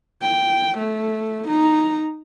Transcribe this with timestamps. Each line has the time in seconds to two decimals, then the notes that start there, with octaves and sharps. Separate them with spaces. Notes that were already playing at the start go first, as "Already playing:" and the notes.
0.22 G5
0.78 A3
1.48 D#4 A#5